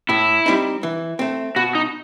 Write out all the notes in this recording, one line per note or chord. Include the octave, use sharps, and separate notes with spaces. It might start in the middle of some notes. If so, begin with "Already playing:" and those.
A2 E4
G3 C4 D#4
E3
A3 C4
B2 F#4
D#4